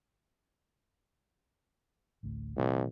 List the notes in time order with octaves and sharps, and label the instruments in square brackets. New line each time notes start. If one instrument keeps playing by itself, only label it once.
[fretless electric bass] A1 D2 A2
[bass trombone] C2 [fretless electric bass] A#2 E3 A3